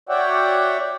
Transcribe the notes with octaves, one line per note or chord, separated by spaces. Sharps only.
F#4 C#5 D5 E5 F#5 G5